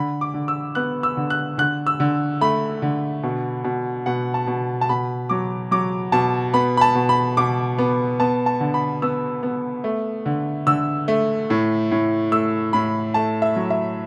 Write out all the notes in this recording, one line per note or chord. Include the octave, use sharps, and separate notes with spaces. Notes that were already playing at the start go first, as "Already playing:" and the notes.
Already playing: D3 B5
D6
D3
E6
B3 F#6
E6
D3
F#6
D3 F#6
E6
D3
A3 B5
D3
B2
B2
B2 F#5
A5
B2
A5
B2 B5
F#3 D6
F#3 D6
B2 A5
B3 B5
B5
A5
B2
B5
B2 D6
B3
B3 A5
A5
D3
B5
B3 E6
B3
A3
D3
D3 E6
A3
A2
A2
A3 E6
A2 B5
A3 A5
E5
F#3
E5